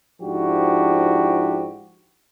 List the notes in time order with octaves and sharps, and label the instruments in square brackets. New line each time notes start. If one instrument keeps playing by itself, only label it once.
[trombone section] G#2 F3 D4 E4 F#4 G4